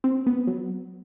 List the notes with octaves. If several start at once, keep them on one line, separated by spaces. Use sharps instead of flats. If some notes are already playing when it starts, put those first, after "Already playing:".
C4
B3
F#3